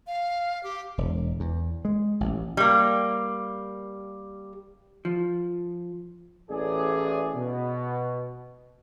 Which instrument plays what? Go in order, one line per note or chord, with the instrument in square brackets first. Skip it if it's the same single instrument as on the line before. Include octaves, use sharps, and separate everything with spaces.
[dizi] F5
G4
[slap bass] E1
E2
G#3
A1
[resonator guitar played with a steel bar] G3 A#3
[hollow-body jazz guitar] F3
[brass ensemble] A1 G#4 D5
B2